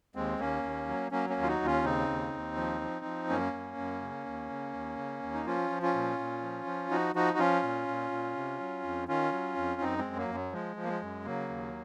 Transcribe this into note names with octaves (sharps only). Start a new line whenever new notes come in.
D#2 G#3 C4
D#2 A#3 C#4
D#2
F#3
F#3 A#3 C#4
A#3 C#4
D#2
F4
D#4 F#4
D#2
C#4 F4
C#3 C4 D#4
D#2
D#2
F3
F3
F3
F#2 A#3 C#4
F#2
F#2
C#3
D#2
C#3
D#2
C#3
D#2
D#4
F3 C#4 F4
F3
C#4 F4
A#2
A#2
F3
F3
F3 D#4 F#4
F3 D#4 F#4
F#4
F3 C#4 F4
A#2
A#2
A#2
C3
F#3
F2
D#3 C#4 F4
F#3
F2
F#2 C4 D#4
G#3 C4
F#2
F#3 A#3
F#2
F#3
F3 G#3
F3
A#3
G#3
F#2
C#3 F#3 A#3
D#2